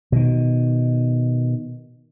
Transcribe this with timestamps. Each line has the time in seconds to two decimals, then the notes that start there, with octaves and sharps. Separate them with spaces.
0.12 B2 D#3